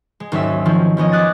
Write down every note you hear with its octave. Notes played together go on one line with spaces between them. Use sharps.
G#3
G#1 D#2 F#3 C#4 E5 E6
D#3 F3 C4 C#4
F3 B3 C#4 D#5
D6 D#6 F#6 G#6 A6